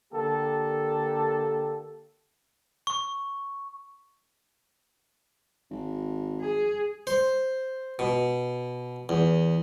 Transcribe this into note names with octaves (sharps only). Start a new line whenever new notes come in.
D3 A#3 G4 A4
C#6
G#1
G#4
C5
B2
E2